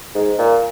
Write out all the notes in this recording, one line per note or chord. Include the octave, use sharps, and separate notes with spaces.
G#2
A#2